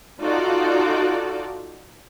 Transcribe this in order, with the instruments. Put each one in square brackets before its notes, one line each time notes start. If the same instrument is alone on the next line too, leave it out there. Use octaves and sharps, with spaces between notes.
[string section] D#4 F4 F#4 A4 D5